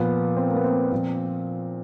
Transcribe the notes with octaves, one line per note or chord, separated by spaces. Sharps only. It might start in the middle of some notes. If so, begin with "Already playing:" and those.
Already playing: A#2 F3 B3
C4
A#3
B3
C4
A#2 F3